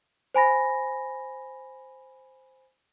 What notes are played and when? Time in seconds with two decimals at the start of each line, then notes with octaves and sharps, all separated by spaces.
0.34 C5 G#5 B5 A#6